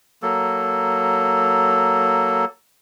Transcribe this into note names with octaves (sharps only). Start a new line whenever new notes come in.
F#3 A#3 A4